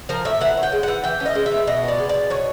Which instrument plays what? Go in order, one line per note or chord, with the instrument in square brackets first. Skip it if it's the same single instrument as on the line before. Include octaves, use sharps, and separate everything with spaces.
[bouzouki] F3 A#4
A2 E5
E3 F#5
C#4
G5
G#3
E3 F#5
E3 G5
C#4
D#5
G#3
E5
E3
B2 D#5
B3 D5
G#3
B2 D5
B2 C#5